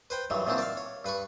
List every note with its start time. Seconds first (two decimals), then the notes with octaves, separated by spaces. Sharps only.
0.10 B4 C5 G5
0.30 G2 D#3 E3 F#3
0.47 A#2 D#3 E3 C4 D4 F#4
0.58 D5 E5 F5
0.77 C#5
1.05 G2 B4 B5 C#6